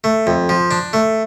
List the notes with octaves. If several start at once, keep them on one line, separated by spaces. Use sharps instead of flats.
A3
F2
F3
D4
A3